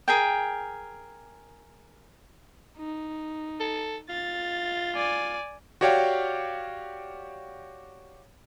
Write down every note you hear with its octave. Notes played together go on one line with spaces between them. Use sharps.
G#4 A#4 G5
D#4
A4
F4 A6
D5 G#5
F#4 G4 C#5 D5 F5 G5